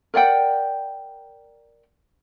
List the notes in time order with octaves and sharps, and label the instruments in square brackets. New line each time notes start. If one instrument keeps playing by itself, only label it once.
[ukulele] A#4 D5 F#5 G5